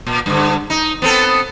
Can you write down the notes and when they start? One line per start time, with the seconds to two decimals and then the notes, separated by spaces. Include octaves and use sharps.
0.07 A#2
0.26 G2 D3
0.70 D#4
1.02 B3 C4 A4